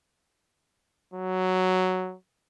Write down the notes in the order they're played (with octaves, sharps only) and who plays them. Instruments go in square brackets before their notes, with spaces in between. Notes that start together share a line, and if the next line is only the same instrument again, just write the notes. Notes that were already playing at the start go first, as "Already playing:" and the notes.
[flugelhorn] F#3